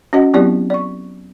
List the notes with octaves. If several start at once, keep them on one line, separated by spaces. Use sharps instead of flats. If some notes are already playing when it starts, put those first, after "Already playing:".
C#4 F#4 D#5 F#5
F#3 B3 C4 E4 G4 D5
D5 C#6